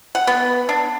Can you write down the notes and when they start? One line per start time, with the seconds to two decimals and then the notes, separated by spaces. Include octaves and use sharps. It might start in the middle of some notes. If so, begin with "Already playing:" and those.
0.15 F#5
0.27 B3
0.69 D4